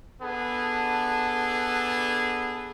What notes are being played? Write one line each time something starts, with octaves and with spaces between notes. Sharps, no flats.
B3 D4 G#4 A4